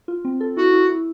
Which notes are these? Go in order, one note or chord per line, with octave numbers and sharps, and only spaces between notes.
F4
C4
A4
E4 F#4
E4
E4